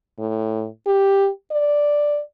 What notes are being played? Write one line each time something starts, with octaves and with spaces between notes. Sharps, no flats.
A2
G4
D5